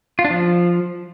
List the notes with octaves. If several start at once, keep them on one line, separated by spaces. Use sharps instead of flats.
F4
D4
F3